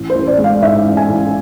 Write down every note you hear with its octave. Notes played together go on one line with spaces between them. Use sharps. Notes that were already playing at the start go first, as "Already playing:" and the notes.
Already playing: A1
C5
A1
D5
G#3
F5
G#2 E5
A1
G#5
A1